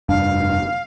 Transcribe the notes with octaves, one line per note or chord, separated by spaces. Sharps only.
F1 G2 D4 F5